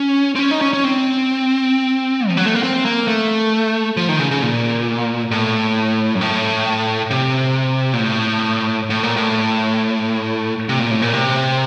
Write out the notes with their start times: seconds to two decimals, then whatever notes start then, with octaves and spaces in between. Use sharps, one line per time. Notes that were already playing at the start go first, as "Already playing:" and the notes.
Already playing: C#4
0.35 C4
0.39 C#4
0.51 D#4
0.61 C#4
0.73 C#4
0.85 C4
2.28 F3
2.37 F#3
2.46 A3
2.55 A#3
2.63 C4
2.85 A#3
3.08 A3
3.97 F3
4.09 D#3
4.19 C#3
4.31 C#3
4.42 A#2
5.31 A2
6.15 F#2
6.21 A2
7.10 C3
7.93 A#2
8.00 A2
8.90 A2
9.03 A#2
9.16 A2
10.69 C3
10.80 A#2
10.91 A2
11.02 A#2
11.13 C3